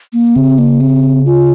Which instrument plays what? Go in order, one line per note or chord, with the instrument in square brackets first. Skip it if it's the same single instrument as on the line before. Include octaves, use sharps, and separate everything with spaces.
[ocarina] A#3
[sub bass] C#3 [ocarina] C4
[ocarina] A#3
C4
F4